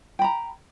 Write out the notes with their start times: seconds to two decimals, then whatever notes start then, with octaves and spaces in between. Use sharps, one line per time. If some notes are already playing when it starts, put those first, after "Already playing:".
0.19 G5
0.22 B5
0.24 A#5